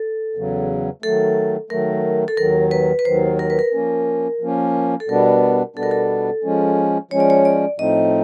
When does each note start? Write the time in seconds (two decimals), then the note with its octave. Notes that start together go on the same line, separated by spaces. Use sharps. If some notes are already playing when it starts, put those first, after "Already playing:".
Already playing: A4
0.35 E2 C#3 F#3
1.02 D#3 F#3 A3 A4
1.70 D#3 F#3 A3 A#4
2.28 A4
2.37 D#2 D#3 F#3 A#4
2.71 B4
2.99 B4
3.05 D#2 D#3 F#3 C5
3.39 A#4
3.50 B4
3.59 A#4
3.73 F3 A#3 C#4
4.41 F3 A#3 C#4
5.00 A4
5.08 B2 G3 B3 D4 A#4
5.76 B2 G3 B3 D4 A4
5.83 A#4
5.91 A4
6.44 F3 G#3 C#4
7.11 F3 G#3 C#4 C#5
7.20 D5
7.30 C#5
7.45 D5
7.79 A2 F3 A3 C4 D#4 D#5